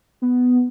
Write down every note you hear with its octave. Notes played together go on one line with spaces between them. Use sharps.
B3